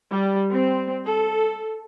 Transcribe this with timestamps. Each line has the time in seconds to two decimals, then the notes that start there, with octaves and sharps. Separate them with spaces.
0.10 G3
0.52 C4
1.05 A4